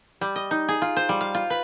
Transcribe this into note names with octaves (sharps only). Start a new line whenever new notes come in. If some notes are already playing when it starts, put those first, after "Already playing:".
G3
D#5
D#4
G#4
F4
C5
G3
F5
F4
B4